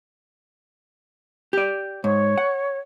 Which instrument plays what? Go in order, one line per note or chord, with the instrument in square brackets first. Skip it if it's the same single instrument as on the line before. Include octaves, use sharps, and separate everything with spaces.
[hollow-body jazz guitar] G4 D5
[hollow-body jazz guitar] G#2 [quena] C#5
[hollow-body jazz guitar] F#5